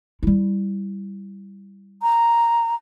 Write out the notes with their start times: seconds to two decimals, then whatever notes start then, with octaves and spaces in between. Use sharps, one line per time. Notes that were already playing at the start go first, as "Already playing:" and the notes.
0.23 G3 E4
2.02 A#5